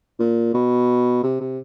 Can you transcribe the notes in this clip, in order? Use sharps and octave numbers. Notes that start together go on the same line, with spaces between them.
A#2
B2
C3
C3